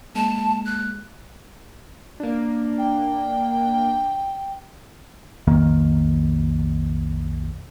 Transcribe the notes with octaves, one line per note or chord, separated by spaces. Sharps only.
G#3 A#3 A5
F#6
A#3 D4
G5
B1 F2 D#3 A#3